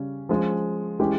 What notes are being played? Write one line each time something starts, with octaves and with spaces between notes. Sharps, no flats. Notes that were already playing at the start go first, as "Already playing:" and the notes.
Already playing: C#3 G3 C#4
F3 G#3 C#4
E3 G#3 C#4 G4